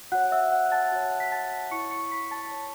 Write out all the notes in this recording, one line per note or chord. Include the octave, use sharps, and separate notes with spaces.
F#4 C#5 F#5 F#6
E5 E6
F#5 F#6
F#6
A5 A6
F#4 C#5 A5 A6
B6
A5 A6
E4 C#5 C#6 C#7
C#6 C#7
B5 B6
A5 A6
E4 C#5